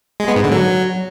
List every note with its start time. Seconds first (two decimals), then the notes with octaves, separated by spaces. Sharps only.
0.20 G#3
0.28 B3
0.36 G#2
0.44 D3
0.52 F#3